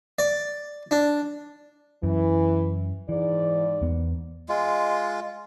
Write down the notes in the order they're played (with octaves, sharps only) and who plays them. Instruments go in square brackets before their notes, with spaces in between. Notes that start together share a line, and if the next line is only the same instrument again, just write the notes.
[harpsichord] D5
D4
[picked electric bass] F#2 [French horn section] E3
[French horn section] G#2 D5 [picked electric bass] E3
[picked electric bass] E2 B3
[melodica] G#3 F4